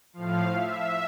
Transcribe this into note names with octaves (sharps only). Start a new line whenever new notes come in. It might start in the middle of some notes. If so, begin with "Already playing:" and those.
A2 F3 F5
E5